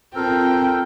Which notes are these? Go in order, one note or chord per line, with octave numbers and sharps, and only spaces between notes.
C4 F4 A4 A#4 G5